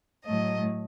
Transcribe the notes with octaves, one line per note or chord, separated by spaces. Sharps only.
A2 F#3 A3 D#5